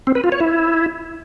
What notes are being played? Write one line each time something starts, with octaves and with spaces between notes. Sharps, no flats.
C4
B4
F4
C#5
E4